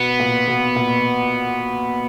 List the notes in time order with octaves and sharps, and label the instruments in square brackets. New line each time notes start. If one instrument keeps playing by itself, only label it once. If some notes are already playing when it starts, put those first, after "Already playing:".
Already playing: [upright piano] B2 [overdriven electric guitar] B3
[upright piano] A#2
B2
A#2